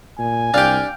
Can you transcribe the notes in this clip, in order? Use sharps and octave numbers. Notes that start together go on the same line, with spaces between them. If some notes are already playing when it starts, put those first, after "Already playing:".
A#2 G#5
C2 D4 G4 F5 G5